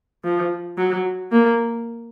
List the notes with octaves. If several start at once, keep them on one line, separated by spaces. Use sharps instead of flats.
F3
F#3
A#3